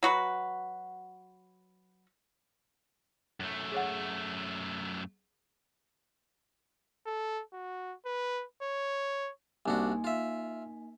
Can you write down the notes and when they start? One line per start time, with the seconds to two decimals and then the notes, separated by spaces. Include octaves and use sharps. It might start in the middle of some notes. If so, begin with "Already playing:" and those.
0.03 F#3 F#4 B4
3.40 F#2 A3
3.72 G#4 C#5 F#5
7.06 A4
7.53 F#4
8.06 B4
8.62 C#5
9.66 C2 A#3 D4 D#4 F#4 G#5
10.04 F4 E5